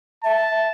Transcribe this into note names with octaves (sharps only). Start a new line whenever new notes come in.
E5 A5